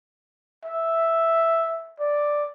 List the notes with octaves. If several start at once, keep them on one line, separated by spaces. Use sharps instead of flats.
E5
D5